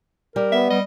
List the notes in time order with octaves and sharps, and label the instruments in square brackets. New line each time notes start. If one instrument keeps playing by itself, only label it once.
[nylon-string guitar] G3 [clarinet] A#4
[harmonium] B3 [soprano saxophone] E5
[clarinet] G3 [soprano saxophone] D#5